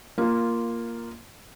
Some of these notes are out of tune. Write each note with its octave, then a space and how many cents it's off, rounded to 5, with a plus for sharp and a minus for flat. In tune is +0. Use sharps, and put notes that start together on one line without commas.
A#3 +0 F4 -10